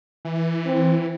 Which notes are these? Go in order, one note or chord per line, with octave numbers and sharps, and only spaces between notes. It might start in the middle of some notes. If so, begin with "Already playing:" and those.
E3
C4